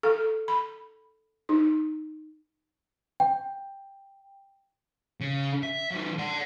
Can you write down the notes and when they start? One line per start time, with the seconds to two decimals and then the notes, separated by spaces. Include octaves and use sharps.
0.03 A4
0.48 B5
1.49 D#4
3.20 G5
5.21 C#3
5.63 E5
5.91 D#3 F#3
6.19 D5 F#5